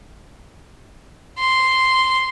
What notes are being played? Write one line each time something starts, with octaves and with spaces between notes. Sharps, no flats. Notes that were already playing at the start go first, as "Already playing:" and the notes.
C6